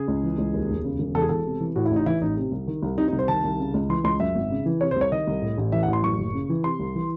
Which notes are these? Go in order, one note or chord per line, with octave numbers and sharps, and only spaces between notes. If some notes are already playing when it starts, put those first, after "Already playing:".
Already playing: C#3 G#4
C#2
E3
C#2
D#2
E1
C#3
E1
E2 A4
G#4
E1 A4
C3
E3
A2 F#4
E4
A1
D#4
E3 E4
A1 D#4
C3
C2
D#3
C2
C3 D#4
D#4
C2
C5
D#3 A5
C2
C#3
C#2
E3 C6
C#2 C6
F#2 E5
G#1
C#3
E3
C3 C#5
C5
C2 C#5
D#3 D#5
C2
A2
A1
E3 E5
F#5
A1
C6
F#2 C#6
F#1
C#3
E3
C3 C6
C2
E3